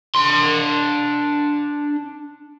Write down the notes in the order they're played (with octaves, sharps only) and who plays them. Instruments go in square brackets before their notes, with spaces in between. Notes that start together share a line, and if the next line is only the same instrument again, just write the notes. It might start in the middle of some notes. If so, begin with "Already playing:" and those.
[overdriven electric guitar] D4 C6